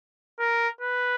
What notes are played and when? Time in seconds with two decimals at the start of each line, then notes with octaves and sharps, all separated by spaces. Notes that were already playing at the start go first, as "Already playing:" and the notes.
0.40 A#4
0.81 B4